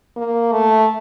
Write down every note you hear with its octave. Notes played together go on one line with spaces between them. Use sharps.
A#3
A3